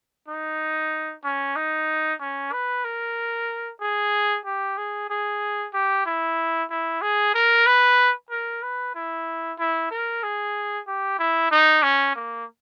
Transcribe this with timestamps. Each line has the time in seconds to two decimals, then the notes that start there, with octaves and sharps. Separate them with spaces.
0.28 D#4
1.24 C#4
1.56 D#4
2.21 C#4
2.53 B4
2.85 A#4
3.81 G#4
4.46 G4
4.78 G#4
5.10 G#4
5.73 G4
6.06 E4
6.70 E4
7.02 G#4
7.35 A#4
7.66 B4
8.31 A#4
8.63 B4
8.95 E4
9.59 E4
9.91 A#4
10.23 G#4
10.88 G4
11.19 E4
11.52 D#4
11.83 C#4
12.16 A#3